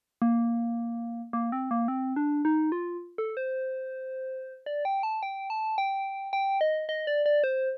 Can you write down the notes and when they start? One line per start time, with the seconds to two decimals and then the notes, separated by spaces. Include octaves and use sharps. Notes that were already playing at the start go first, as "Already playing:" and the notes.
0.22 A#3
1.33 A#3
1.52 C4
1.71 A#3
1.88 C4
2.16 D4
2.45 D#4
2.72 F4
3.18 A4
3.37 C5
4.66 D5
4.85 G5
5.03 A5
5.23 G5
5.50 A5
5.78 G5
6.33 G5
6.61 D#5
6.89 D#5
7.07 D5
7.26 D5
7.44 C5